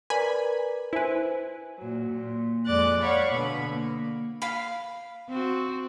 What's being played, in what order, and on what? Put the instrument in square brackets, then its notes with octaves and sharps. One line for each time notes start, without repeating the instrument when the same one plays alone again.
[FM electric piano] A#4 B4 D5 [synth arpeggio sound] G#5 B5
[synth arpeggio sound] E4 B4 [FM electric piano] C5 G#5
[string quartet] A#2 F#3
A#2
F2 G#3 D5 D6 F#6 A6
C#5 D5 F5 F#5 B5 C#6
B2 D3 B3 B5
A#3
[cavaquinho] F5 B5
[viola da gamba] C4 F#4